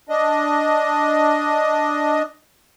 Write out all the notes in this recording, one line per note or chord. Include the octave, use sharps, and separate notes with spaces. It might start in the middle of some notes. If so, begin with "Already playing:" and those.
D4 D#5